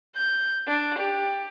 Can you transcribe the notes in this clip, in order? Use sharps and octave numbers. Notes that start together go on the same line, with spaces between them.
G6
D4
G4